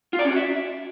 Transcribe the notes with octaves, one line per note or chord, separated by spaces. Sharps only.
F4
D5
C#4
F#4
E5